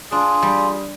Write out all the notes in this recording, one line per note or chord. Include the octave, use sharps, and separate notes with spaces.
D4 F4 G#4
G3